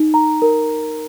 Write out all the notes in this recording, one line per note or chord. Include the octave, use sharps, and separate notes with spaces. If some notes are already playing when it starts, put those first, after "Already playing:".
Already playing: D#4
A#5
A#4